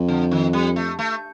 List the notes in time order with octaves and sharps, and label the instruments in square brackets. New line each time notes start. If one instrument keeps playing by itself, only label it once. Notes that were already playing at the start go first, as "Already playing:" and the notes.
Already playing: [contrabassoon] F2
[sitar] D3
D#3
G3
A3
A3